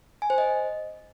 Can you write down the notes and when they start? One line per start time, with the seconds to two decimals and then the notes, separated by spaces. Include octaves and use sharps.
0.22 G#5
0.30 C5
0.38 D#5